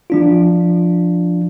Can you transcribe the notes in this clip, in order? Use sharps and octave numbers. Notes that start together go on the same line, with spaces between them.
F3 D4 F4